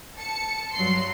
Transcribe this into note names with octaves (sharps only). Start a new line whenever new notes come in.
A5 C#7
G2 F#3 C6 C7